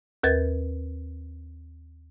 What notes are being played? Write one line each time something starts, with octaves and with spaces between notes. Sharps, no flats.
D#2 A#4 B4 A6